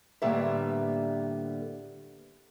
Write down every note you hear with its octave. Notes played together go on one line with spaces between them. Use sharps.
A2 D3 G3 A#3 B3 E5